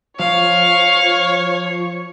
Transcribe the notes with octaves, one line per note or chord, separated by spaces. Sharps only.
F3 C#5 F5